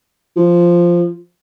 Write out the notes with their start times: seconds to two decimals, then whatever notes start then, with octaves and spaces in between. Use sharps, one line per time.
0.37 F3